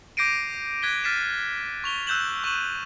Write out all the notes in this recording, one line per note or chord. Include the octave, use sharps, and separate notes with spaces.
D6 G6 A#6 C7 D7 D#7
F#6 G#6 B6 G7
F6 A6 B6 C7 D#7 E7
C#6 F7 G7
E6 F#6 G6 E7 F#7
C#6 D#7 E7 F#7